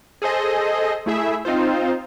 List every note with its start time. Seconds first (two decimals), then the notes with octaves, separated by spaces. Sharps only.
0.22 G#4 A4 C5 D#5
1.06 A3 E4 G#4 E5
1.45 C4 D#4 F4 C5